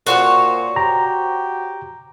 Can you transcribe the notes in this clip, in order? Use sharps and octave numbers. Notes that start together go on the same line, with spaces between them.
A#2 F#4 C5 C#5
G4 A#5